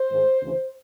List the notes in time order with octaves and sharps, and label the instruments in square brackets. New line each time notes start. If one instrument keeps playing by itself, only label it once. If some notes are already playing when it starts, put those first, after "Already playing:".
Already playing: [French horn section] C5
G#2 D#3 G#3
D2 C#3 E3